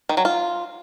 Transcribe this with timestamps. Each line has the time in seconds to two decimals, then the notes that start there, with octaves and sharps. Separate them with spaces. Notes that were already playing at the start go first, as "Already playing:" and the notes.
0.09 D#3
0.17 F#3
0.25 F4